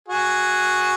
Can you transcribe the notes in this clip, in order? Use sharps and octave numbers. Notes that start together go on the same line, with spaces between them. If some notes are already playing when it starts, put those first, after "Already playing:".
F#4 G#4